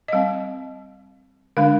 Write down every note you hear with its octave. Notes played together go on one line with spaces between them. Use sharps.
D#5
G3 C4 F5
D3 G#3 D4 F5